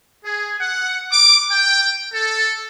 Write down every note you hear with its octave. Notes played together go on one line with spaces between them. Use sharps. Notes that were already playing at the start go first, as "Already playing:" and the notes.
G#4
F#5
D6
G5
A4